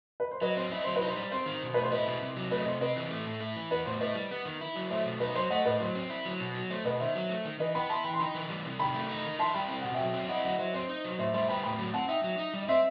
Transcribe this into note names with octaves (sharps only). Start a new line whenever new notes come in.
B4
C5
F#3 B4 D#5
C4 C5
E4 D#5
F#3 C5
B4
D#4
C5
G3
C4 C5
D#3
B2
A3 B4
C5
E4 B4 D#5
B2
C3
F#3
A3 B4
D#5
C3 C5
C4 B4 D#5
E3
A3
A2
E4
E3
B3 B4
A2 C5
E4 B4 D#5
G3
B3
D#3
E4
F#3
A3 C5 E5
B2
D#4 B4
F#3 C5
A3 D#5 F#5
A2 B4 D#5
F#3 C5
C4
E4
F#3
B2
F#3
A3 C5
B2 B4 D#5
D#3 C5 E5
F#3
A3
D#3
E3 B4 D#5
B3 G5 B5
E4 A5 C6
E3 G5 B5
C6
D#4 G5 B5
E3
G3
C3
D#3 G5 B5
A3
D#4
D#3
E4 A5 C6
G3 G5 B5
C4 G5
B2 F#5
F#3 E5 G5
C4
E4 D#5 F#5
F#3 D#5 F#5
F#3 C5 E5
C4 C5
D#4
F#3
A2 C5 E5
G3 C5 E5
B3 G5 B5
A2 G5 B5
F#3
C4 F#5 A5
D#4 E5 G5
F#3
D#4
G3
D#5
C4 C5 E5